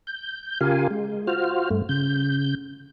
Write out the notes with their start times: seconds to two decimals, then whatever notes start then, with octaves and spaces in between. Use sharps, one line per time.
0.07 G6
0.61 C#3 F4 G4 A#4 F5 G#5
0.91 G#3
1.27 F4 F#4 C5 F6
1.70 G2 A3
1.89 C#3 G6